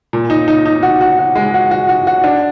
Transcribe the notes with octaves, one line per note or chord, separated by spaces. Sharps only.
A#2
D#4
D#4
D#4
F#4
F#4
F#4
G#3
F#4
F#4
F#4
F#4
D4